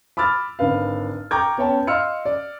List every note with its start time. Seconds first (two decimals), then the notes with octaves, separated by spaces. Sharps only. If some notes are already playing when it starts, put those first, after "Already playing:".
0.17 B5 D6 E6 F6 A6
0.59 G#1 D3 B4 F5
1.31 G5 A#5 C#6 D6 G6 G#6
1.58 B3 C#4 C#5 G5 A5
1.87 D#5 F5 C6 E6 F6 C#7
2.25 D5